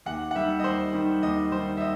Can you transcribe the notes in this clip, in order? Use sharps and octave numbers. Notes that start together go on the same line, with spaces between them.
D#2 F#5
F#5
D#3 G3 E5
D#5
D#2 C5
D#3 G3
D#2 D#5
D#3 G3 C5
E5
D#5